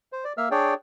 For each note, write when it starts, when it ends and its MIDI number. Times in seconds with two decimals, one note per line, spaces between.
0.12 0.24 72
0.24 0.33 74
0.38 0.49 58
0.38 0.49 76
0.38 0.49 77
0.38 0.49 88
0.38 0.49 89
0.51 0.74 62
0.51 0.74 68
0.51 0.74 73
0.51 0.74 74
0.51 0.74 79